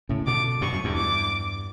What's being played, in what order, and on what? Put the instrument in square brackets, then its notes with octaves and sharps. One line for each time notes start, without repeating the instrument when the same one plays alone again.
[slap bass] A2 C#3
[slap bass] B2 D3 [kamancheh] D6
[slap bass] G2 B2 [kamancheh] C#6
[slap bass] F#2
E2 G2
[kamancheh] D6